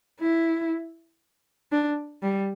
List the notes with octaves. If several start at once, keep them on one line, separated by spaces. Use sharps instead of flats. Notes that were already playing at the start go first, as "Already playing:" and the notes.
E4
D4
G3